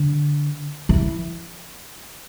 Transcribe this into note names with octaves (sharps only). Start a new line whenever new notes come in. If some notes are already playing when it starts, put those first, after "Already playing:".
Already playing: D3
E3